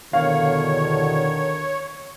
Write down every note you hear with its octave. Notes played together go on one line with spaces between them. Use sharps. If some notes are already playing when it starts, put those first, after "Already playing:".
E2 B2 D3 D#3 C#5 F5